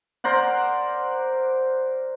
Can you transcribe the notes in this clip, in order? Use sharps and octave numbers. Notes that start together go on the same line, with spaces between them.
A#4 C5 D5 F#5